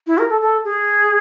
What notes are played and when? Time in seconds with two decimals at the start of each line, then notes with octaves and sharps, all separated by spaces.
0.07 E4
0.18 A#4
0.30 A4
0.41 A4
0.64 G#4